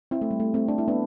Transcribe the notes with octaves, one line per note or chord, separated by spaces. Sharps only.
C4 E4
A3
G3
A3
A3 C4
D4
E4
B3 D4